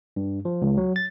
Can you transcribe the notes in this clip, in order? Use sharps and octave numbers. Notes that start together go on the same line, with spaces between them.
G2
F3
C#2
F#3
A6